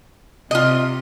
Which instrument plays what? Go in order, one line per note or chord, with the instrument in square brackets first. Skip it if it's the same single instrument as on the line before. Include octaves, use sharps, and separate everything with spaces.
[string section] C3 [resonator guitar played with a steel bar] F4 D#5